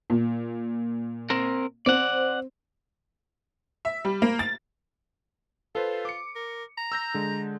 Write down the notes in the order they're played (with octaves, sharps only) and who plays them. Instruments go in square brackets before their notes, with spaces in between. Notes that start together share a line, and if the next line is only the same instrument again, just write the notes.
[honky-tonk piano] A#2
[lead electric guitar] C4 A#4
[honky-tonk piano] C4 [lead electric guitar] D5 F#5
[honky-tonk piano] E5
G3
A#3
A6
[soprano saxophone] F4 [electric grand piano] A4 B4 C5
[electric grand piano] D6 C#7
[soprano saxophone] A#4
A#5
[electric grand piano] E6 G6 A#6
D3 G#3